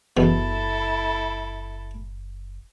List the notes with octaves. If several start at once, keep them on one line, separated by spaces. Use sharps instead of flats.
F#1 E2 B2 E4 A4